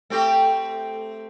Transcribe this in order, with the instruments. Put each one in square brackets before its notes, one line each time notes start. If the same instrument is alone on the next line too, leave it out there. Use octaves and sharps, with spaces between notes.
[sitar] A3 C4 G4